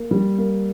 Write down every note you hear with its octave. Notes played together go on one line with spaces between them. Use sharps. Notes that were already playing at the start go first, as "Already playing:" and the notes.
Already playing: A#3
G3
A#3